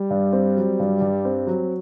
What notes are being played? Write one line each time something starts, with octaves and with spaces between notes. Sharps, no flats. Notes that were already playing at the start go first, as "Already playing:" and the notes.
Already playing: G3
G2
C4
F#3
G2
G2
C4
F#3